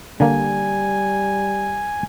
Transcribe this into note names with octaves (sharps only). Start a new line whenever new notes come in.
D3 G3 A#3 G#5